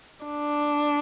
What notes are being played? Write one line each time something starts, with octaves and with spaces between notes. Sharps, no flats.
D4